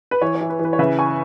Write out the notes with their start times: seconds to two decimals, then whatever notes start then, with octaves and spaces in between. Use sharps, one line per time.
0.11 B4
0.21 E3 C#5
0.35 C#5
0.41 E3
0.50 B4
0.59 E3
0.65 B4
0.73 C#5
0.79 C#3 B4 E5
0.99 G#5 C#6